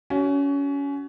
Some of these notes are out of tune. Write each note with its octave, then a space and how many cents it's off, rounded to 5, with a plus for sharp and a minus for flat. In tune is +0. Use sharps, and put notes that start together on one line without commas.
C#4 +25 F#4 +30